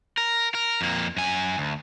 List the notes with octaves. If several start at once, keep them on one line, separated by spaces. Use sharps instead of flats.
A#4
A#4
F2 A#3
F#2 G#5
D2